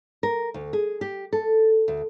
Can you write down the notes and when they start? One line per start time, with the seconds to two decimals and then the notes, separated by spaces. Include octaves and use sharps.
0.23 A#4
0.54 D2
0.73 G#4
1.01 G4
1.33 A4
1.88 D2